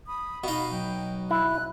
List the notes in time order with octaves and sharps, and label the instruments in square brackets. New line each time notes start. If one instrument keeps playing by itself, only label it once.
[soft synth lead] B5 [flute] D#6
[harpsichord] B2 D#4 [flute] F5
[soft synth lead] F#3 [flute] G5
[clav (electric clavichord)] E4 [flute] F#6